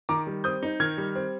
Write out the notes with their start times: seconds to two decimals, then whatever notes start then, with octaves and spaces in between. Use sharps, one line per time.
0.09 D#3 A#5 D6
0.27 G3
0.44 C4 D#6 G6
0.63 D#4
0.80 D#3 F6 G#6
0.98 G3
1.15 C4